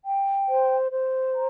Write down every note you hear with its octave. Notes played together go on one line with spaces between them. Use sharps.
G5
C5
C5
A#5